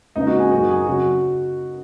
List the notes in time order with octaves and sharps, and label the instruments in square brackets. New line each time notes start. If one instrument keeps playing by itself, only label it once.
[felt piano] C#2 C#3 A#3 C#4 [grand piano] D#4
[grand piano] F#4
G#4
[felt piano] F#2 F#3 D#4 A#4 [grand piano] F#4
[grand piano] G#4
[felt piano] C#3 F#3 [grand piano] F#4